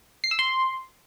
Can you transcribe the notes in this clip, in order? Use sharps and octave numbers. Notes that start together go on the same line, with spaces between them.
C7
E6
C6